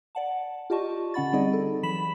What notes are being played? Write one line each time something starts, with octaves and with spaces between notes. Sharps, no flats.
D5 F#5 A5
F4 G4 D5 D#5 A5 C#6
D3 C#4 F#5 B5 A6
G3 C4 D#4 G#4 D5 D#5
A4
E3 F#3 B5 B6 E7 F#7